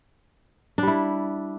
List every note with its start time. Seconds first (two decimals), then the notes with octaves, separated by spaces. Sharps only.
0.78 D4
0.83 G3
0.87 E4